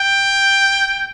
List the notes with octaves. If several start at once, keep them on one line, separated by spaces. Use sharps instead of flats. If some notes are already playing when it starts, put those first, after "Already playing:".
Already playing: G5